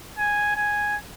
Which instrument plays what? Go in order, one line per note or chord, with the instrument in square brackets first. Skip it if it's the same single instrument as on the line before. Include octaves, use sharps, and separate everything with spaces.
[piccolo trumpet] G#5
G#5